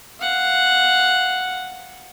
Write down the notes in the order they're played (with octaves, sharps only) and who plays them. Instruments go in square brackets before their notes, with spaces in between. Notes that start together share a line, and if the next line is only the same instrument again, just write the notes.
[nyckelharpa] F5 F#5